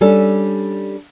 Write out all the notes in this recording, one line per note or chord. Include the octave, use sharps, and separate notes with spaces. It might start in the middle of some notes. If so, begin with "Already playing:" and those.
G3 C#4 D4 A4